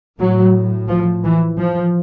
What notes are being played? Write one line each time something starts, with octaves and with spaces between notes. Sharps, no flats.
A2 F#3
F3
E3
F3